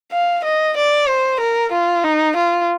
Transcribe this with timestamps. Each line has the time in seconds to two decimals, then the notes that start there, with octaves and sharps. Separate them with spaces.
0.12 F5
0.44 D#5
0.77 D5
1.08 C5
1.40 A#4
1.72 F4
2.04 D#4
2.36 F4